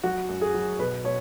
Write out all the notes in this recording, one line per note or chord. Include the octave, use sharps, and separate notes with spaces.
F#3 F#4
F#2
G#4
F#3
B2 B4
B2 C#5